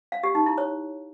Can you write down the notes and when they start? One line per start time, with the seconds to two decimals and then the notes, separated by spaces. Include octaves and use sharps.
0.12 F5
0.23 G4
0.35 D#4
0.46 E4
0.58 C#5